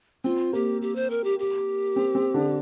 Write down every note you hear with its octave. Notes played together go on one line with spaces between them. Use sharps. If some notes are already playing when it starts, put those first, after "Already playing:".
C4 F4
A#3 G4
G4
C5
A#4
G4
G4
C4
C4
D3 D4